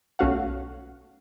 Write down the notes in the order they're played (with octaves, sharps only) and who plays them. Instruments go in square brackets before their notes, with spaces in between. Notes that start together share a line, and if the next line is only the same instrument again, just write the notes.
[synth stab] B1 A3 C#4 F#4 F5 F#5